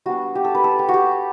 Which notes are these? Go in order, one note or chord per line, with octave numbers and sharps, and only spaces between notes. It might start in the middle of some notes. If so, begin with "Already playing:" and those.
G3 B3 D4 F#4
G4
A4
B4
A4
G4
F#4
G4